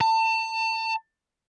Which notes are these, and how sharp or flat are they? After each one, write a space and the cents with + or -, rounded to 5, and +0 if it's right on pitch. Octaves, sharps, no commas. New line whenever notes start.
A5 +30